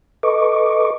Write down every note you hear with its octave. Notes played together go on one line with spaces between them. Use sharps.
A4 B4 D#5 C#6 D6